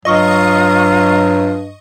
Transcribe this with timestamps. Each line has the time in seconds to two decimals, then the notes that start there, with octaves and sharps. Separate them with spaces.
0.05 G2 F#3 F4 D#5 C#6 D#6